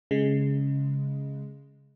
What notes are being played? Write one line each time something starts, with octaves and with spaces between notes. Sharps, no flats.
C#3 G#3